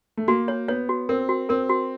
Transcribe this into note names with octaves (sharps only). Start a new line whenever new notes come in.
A3
A#3 F#4
C#5
B3 C#5
F#4
C4 A#4
F#4
C4 A#4
F#4